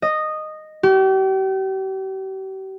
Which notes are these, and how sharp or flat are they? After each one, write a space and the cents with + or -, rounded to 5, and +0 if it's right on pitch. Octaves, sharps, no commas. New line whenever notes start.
D#5 -10
G4 -40